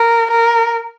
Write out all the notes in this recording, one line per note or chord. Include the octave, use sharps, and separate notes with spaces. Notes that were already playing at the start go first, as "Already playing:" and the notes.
Already playing: A#4
A#4